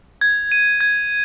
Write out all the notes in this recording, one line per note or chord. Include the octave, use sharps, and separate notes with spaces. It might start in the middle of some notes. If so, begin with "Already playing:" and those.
G#6
D#7
G#6